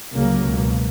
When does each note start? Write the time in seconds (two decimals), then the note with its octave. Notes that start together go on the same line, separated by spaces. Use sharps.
0.14 C#2 C#3 F#3 A#3
0.44 C#2 B2